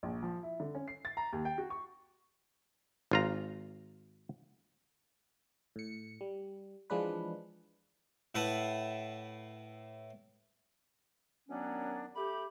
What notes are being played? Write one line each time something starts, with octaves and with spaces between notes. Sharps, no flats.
A#1
F3
E4
D3
C#4
C7
A6
A#5
D#2
G5
F#4
C#6
G#1 F4 A#5
A2 C#7
G3
E3 F3 G#3 D4 B4
A2 E4 B4 F#5 A5
F#2 D#3 F#3 B3 C#4 D4
A3 G4 B5